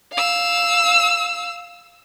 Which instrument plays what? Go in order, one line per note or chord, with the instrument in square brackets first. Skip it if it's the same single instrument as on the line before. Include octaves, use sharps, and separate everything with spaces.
[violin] F5 E6